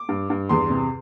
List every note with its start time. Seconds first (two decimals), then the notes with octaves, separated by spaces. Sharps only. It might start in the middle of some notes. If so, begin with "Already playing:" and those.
Already playing: D6
0.09 G2
0.30 G2
0.49 E2 C6
0.70 C3